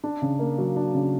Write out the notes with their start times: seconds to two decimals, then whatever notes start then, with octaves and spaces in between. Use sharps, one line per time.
0.04 D4
0.22 C#3
0.39 A#3
0.58 F#3
0.76 D4
0.94 C#3